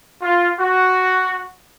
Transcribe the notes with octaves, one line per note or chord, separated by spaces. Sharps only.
F4
F#4